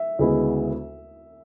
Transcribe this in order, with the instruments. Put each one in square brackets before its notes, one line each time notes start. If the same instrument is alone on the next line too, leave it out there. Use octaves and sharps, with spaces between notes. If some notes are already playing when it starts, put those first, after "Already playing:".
Already playing: [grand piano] E5
[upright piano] D2 C#3 G#3 B3 E4